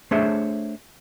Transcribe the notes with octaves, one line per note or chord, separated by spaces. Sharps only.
A3 D4 G#4 C5 C#5 E5